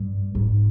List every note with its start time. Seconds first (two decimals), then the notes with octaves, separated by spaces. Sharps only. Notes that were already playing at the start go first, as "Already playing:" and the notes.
Already playing: G2
0.35 G#2